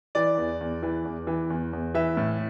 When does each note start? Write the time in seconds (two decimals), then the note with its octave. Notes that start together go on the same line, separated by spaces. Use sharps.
0.15 E3 D5
0.37 E2
0.61 E2
0.83 E3
1.05 E2
1.27 E3
1.50 E2
1.73 E2
1.95 E3 E5
2.17 A2